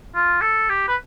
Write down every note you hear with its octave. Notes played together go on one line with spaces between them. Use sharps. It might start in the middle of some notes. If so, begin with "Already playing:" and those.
F4
A4
G4
B4